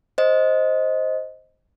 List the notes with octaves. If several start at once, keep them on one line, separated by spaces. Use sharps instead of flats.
C5 D#5